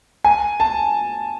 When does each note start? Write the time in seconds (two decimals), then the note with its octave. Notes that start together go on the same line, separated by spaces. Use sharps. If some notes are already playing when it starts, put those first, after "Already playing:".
0.25 G#5
0.60 A5